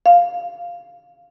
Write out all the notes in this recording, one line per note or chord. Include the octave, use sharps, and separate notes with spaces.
F5